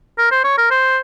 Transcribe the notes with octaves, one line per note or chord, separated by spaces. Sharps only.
A#4
C5
C#5
A#4
C5